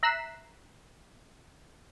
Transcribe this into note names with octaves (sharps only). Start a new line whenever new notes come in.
E5 A#5 F#6 B6 C7 E7